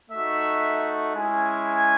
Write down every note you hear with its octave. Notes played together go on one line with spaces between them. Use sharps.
A3 D#4 F#4 E5
G#3 C#4 E4 G#5